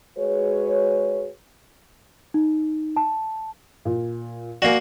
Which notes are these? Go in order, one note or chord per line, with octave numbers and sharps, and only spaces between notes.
G#3 F#4 G#4 B4 C#5
D#4
A5
A#2
A#3 F#4 D5 F5 G#5